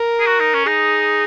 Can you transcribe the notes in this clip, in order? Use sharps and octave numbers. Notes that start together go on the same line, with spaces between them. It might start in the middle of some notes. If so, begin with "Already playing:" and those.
Already playing: A#4
G#4
F#4
D#4
C#4
D#4 G#4